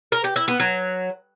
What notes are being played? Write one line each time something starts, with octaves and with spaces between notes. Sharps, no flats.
A#4
G4
E4
B3
F#3